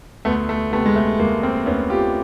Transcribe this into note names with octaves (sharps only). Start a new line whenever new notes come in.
D2 A3 B3
A3
C3 A3 B3
G#3
A3
D2 G#3 A#3
A#3 C4
D2 B3 C#4
F4 G4